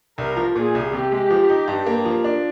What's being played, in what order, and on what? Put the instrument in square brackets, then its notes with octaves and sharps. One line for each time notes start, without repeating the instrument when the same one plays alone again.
[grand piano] C2 [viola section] A#4
[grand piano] F3
[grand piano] A#2 [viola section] G#4
[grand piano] C2
[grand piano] C3 [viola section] G4
[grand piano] G#3
F3
D#4
G2
A#3
F3
D4